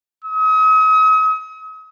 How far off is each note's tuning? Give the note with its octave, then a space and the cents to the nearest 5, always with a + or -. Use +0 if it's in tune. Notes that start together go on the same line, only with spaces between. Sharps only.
D#6 +40